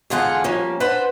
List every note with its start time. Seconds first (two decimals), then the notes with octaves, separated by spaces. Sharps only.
0.10 E2 G#2 D3 F4 G#4 F#5
0.44 F3 G3 A#3 C#4
0.80 D4 B4 C5 F#5